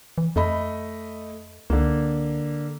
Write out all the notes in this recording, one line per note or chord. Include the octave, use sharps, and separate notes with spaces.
E3
F2 A3 D#5 B5
C#2 D3 A#3